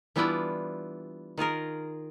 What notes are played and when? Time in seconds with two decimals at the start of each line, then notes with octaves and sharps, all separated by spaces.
0.16 E3 G3 B3 D4 E4 F4
1.38 D#3 F4 G#4 A#4